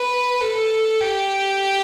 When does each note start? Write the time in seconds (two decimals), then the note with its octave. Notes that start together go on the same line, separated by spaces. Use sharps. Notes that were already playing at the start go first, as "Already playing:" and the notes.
Already playing: B4
0.41 A4
1.00 G4